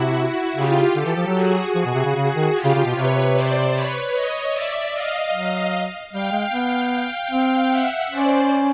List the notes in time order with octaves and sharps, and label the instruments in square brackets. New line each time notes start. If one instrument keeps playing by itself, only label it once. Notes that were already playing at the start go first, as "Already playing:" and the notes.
Already playing: [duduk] C3 [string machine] E4 F#4
[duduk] C#3 [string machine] F4 G4
[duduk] D3 [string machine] G4 A4
[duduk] E3
F3
F#3
[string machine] F#4 G#4
[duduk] F3
B2
C3
C#3
[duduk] C#3 [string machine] F#4 G#4
[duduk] D#3
[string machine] F4 G4
[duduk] C#3
C#3
B2
[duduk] C3 [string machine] B4 C#5
[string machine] C5 D5
B4 C#5
C#5 D#5
D5 E5
D#5 F5
[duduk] F#3
[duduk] G3 [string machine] F5 G5
[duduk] G#3
B3
C4
[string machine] E5 F#5
[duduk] C#4 [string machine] C5 D5